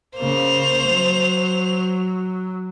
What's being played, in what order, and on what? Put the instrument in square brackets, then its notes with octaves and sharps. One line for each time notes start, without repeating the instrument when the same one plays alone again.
[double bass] C#3 A#3 [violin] C5 F7
[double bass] F#3